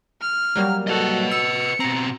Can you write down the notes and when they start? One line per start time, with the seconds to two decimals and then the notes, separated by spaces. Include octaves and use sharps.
0.21 F6
0.56 F#3 G3 A#3
0.87 F#4 A4 B4 D#5
1.31 E6 C#7
1.80 B2 C4 A#5